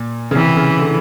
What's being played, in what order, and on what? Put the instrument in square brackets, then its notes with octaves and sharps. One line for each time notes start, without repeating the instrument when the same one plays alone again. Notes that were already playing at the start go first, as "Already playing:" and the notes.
Already playing: [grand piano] A#2
C#3
[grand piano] C3 [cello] E3
[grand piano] C#3
D3